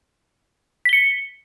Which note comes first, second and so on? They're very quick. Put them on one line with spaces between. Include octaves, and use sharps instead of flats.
B6 G7 C#7